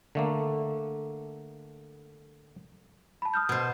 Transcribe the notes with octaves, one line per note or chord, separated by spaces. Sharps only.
D3 A3 A#3
A5 B5
D#6 F6 G6
B2 C5